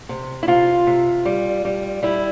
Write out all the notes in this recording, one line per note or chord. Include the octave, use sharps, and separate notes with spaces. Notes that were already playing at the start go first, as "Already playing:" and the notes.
C3
E4
C3 F4
C3
G3
G3
G3 E4